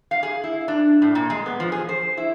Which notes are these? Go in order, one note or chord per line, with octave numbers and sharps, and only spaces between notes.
F5
G#4
E4
D4
A2
A#2
G#3
B3
F3
G#4
C5
E4